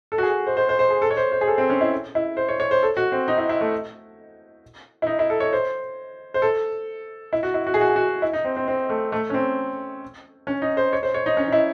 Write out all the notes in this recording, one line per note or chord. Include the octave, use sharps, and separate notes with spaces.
A4
F#4
G#4
C5
C5
C5
C5
G#4
A4
C#5
C5
C5
G#4
A4
C4
C#4
E4
E4
C5
C#5
C#5
C5
A4
F#4
C4
D#4
E4
E4
A3
E4
D#4
E4
A4
C#5
C5
C5
A4
E4
F#4
E4
F#4
G#4
F#4
G#4
F#4
E4
D#4
C4
C4
C4
A3
A3
C#4
C4
C#4
D#4
C5
C#5
C5
C#5
D#4
C#4
D#4
E4